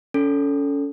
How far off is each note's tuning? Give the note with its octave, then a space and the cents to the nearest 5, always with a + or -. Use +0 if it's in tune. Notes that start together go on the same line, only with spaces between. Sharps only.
C#4 +25 A4 +0